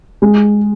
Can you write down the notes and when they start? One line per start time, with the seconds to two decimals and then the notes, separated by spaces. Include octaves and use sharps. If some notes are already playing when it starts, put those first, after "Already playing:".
0.22 G#3